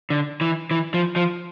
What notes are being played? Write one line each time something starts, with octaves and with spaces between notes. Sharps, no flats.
D3
E3
E3
F3
F3